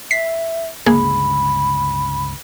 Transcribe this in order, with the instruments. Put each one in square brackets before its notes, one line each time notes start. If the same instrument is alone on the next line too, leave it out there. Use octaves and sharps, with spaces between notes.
[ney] E5 [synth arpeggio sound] B6 C7
[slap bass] C#2 G2 D3 [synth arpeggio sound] A#3 G#4 [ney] B5